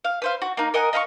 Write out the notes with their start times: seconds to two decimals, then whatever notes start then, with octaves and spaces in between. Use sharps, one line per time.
0.04 F5
0.22 B4 C5 F5
0.42 F#4
0.57 A#3 D#4
0.74 A#4 D#5 F#5 G#5
0.93 D#5 F5 B5 C#6